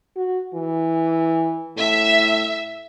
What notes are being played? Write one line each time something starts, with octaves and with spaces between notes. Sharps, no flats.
F#4
E3
A2 E5